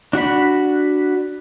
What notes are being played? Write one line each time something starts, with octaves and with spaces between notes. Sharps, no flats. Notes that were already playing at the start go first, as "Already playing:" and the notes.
D4 F#4 F#5 B5